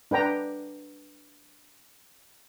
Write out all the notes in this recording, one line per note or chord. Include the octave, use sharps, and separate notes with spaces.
D4 B4 G5 A#5